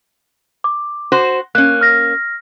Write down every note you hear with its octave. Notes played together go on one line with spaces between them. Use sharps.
D6
F#4 C5
A#3 C#4 F#6
F6 A#6